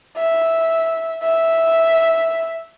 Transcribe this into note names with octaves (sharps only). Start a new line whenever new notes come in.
E5
E5